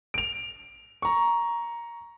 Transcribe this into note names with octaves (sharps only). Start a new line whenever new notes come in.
D7 F7
A#5 C#6